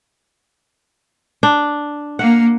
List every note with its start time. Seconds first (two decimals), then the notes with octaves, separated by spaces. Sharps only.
1.43 D4
2.19 A#3 F#5